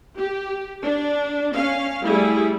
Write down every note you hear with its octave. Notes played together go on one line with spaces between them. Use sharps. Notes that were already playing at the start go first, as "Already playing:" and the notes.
G4
D4
C#4 F5
G3 A3 E4 G#4